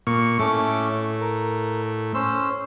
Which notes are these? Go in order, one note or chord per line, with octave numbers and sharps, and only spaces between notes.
A#2 C#6
A2 A3 C#4 D6
A#4
C#4 C5 E6